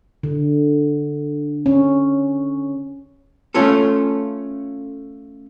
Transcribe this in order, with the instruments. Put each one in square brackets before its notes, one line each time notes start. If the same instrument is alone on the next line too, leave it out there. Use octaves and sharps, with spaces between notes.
[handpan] D3
C#4
[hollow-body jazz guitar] A3 C#4 F4 A4